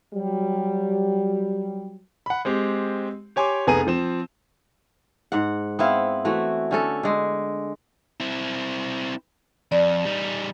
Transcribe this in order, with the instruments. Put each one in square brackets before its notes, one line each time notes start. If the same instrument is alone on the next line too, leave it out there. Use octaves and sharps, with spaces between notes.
[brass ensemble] F#3 G3
[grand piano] F#5 B5
G#3 C4 G4
G4 C#5 G#5 C6 D6
F1 B3 G#4 A#5 D#7
F3 C4 E7
[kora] G#2 F#5
B3 C4 E4 F5
E3 A3 F#4
D3 C#4 A4
D3 G#3
[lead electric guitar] C4 E4
[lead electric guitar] F2 [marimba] D5
[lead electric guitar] G3 D#4